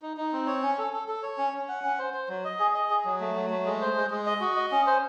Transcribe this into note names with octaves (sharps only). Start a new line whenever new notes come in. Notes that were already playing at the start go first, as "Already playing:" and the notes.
D#4
D#4
C4
C#5
C#4
A4
A4
A4
C#5
C#4
C#4
F#5
C#4
C5
C5
F#3
D#5
G#4
D#5
G#4
F#3
A3
F#3
A3
G#3
C5
G#3
G#3
D#5
F#4
D#5
C#4
C5